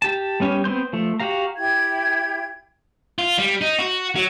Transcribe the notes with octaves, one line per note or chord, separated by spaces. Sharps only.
G4 A5
G3 B3 C#4 G4
B3 C4 C6 G6
F3 A3
F#4 G4 F5 A#5
E4 G4 G5 G#6
F4
G3
D#4
F#4
F#3